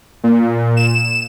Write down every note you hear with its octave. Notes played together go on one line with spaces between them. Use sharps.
A#2
E7